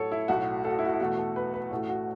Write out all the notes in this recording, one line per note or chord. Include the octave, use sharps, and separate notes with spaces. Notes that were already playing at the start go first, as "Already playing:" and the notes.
Already playing: A1 A2 F#3 A4 C#5
E4
B1 A2 A3 F#4
A4
F#4
E4
F#4
E4
E2 B2 A3 F#4
A4
B4
B4
A1 A2 A3 F#4
F#4